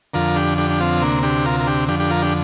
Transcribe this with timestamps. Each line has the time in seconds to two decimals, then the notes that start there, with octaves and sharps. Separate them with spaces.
0.14 F2 D3 F4 A#4
0.36 D4 G4
0.58 D4 G4
0.70 D4
0.80 C4 F4
1.02 D2 C3 A#3 D4
1.23 D4 G4
1.45 F4 A#4
1.60 A#4
1.67 D4 G4
1.88 F2 D3 D4 G4
2.00 D4 G4
2.10 F4 A#4
2.22 D4 G4